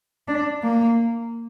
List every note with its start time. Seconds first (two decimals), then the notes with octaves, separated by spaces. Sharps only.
0.28 D4
0.64 A#3